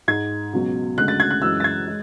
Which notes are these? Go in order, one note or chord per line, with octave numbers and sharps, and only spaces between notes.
G#2 G#3 G#6
C#2 B2 F#3
D2 C#3 G#3 F#6
A6
G#6
F#6
F#2 E3 G#3 E6
A6
G#6
G#3